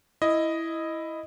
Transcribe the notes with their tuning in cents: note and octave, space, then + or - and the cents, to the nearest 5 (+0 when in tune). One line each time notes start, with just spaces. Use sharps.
E4 +0 D#5 +5